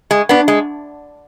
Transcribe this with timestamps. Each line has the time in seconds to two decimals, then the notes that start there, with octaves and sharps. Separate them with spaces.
0.11 G#3
0.29 B3 D4
0.48 G#3